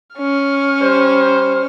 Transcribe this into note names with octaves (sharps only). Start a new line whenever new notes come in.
C#4 F6
G3 C5